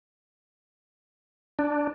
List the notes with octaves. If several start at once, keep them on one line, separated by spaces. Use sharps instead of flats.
D4